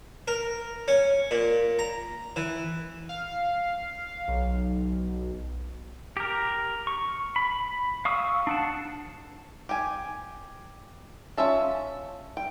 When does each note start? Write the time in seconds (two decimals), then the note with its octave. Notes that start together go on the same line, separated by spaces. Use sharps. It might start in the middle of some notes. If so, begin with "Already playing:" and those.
0.28 A#4
0.88 C#4
1.31 A#2
1.79 A#5
2.36 E3
3.09 F5
4.28 B1
6.17 G4 A#4
6.87 C#6
7.36 B5
8.05 F5 C#6 D#6 E6
8.47 D4 F#5 A5
9.69 G4 G#5
11.37 C#4 F4 E5 A5
12.37 G5